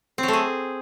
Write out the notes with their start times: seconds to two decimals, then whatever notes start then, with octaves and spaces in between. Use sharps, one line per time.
0.18 C4
0.23 F#3
0.28 A3
0.33 G#4